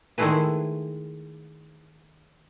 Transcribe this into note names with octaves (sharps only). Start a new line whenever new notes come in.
D#3 G#3 A3 E4 G#4 B4